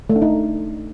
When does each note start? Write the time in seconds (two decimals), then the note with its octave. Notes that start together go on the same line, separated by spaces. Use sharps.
0.10 A3
0.16 D4
0.22 D#4